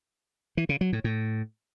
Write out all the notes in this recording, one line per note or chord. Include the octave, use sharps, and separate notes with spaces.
E3
C#3
F#3
A2
A2